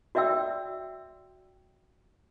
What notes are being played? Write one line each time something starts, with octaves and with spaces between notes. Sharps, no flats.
F#4 D5 E5 G5 E6